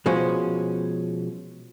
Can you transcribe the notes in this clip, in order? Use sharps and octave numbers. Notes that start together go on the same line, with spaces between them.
B2 F3 G#3 C#4